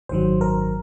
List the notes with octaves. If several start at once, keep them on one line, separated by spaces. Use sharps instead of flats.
G#1 F#2 D#3 F#3 C5
A#4